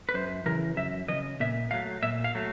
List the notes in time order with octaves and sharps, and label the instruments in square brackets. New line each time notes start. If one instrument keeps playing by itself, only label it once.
[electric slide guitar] B4
F#2 C5
C#3 E3 A#4
F#2 E5
E3 D#5
C#3
A#2 E5
F#3 A3 F5
A#2 E5
F5
F#3 A3